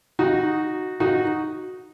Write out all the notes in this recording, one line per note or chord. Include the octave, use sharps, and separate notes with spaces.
D#4 F#4
D#4 F#4